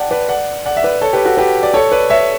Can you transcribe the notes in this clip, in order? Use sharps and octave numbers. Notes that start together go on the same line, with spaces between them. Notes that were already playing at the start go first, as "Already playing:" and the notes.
Already playing: D5 F#5 G5 A5
B4 D5
D5 F#5
D5 F#5
E5
B4 D5
A4 C#5
G4 B4
F#4 A4
G4 B4
D5
A4 C#5
B4 D5
C#5 E5